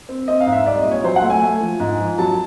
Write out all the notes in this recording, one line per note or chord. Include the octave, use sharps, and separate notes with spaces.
C4
C4 D#5
F5
G#2
E5
C2 D5
D#5
A#2
C#5
F#3 C5
F#5
A3
G#5
A3
F3
G#2
F3
F#3 A5